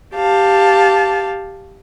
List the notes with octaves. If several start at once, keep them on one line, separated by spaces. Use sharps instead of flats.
G4 F5 A5